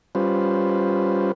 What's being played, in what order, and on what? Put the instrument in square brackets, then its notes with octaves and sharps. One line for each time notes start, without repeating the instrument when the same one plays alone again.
[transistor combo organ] G3 C#4 F4 B4 C5